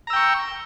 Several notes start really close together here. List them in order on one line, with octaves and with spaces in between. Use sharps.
A#5 E6 G5 C#6